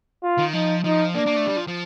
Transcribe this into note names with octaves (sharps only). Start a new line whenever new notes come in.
F4
D#3
F3 D#4
F3 D#4
A#3 D4
A#3
A3
G3
F3
F3